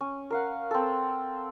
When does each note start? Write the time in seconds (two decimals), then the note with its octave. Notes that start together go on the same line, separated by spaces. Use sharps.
0.01 C#4
0.30 A#4 F5 F#5
0.71 C4 A4